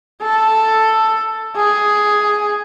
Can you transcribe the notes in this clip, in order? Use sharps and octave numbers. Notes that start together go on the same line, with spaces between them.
A4
G#4